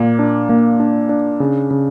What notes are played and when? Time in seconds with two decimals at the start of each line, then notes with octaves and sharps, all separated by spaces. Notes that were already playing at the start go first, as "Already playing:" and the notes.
Already playing: A#2 A#3
0.19 D4
0.49 A#3
0.80 D4
1.09 D4
1.40 C#3
1.71 C#3